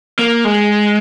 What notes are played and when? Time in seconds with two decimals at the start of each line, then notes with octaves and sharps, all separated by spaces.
0.19 A#3
0.45 G#3